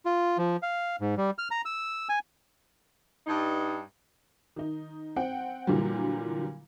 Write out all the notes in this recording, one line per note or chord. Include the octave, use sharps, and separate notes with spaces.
F4
F3
F5
G#2
G3
F6
A#5
E6
G#5
G2 D#4
D#3 D#4
C4 F#5 G5
A#2 D3 E3 F#3 G3